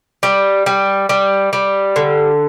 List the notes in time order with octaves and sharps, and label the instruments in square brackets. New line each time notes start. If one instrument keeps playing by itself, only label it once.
[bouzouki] G3
G3
G3
G3
D3